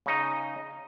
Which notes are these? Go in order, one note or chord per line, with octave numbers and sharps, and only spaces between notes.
C#3 D#4 D#5